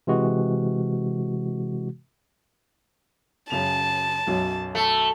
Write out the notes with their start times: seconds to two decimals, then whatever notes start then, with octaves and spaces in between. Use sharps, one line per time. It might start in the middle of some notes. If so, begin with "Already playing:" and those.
0.07 C3 E3 G#3 F#4
3.50 F#2 C#3 A5 F7
4.27 B1 F#2 F#3
4.75 A3 A5